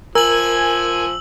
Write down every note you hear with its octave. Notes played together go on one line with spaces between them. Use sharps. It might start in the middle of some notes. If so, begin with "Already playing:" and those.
F3 A#4 G#5 E6 F#7